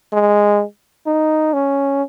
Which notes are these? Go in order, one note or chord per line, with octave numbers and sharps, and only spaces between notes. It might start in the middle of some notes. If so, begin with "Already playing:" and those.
G#3
D#4
C#4